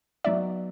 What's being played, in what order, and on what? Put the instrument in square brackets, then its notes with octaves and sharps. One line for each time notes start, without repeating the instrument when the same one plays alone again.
[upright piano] F#3 B3 D#4 [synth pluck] D5 E5